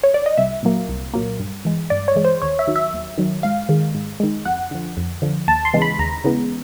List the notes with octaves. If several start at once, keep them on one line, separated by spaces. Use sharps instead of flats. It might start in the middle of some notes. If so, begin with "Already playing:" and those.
C#5
D5
D#5
C2 E5
A#2 F#3 A#3
C2
A#2 F#3 A#3
G2
E3 G#3
G2 D5
C#5
E3 G#3
C5
D#2 C#5
E5
D#3 F#3
E5
D#2
D#3 F#3
G#2 F5
D#3 G#3
G#2
D#3 G#3
F2 F#5
D3 F3
F2
D3 F3
D#2 A5
C6
C#3 E3 G#3 B3
B5
D#2 A#5
C#3 E3 G#3 B3